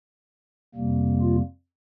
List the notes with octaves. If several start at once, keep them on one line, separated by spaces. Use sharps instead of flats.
F2 C3 G3 A#3
F4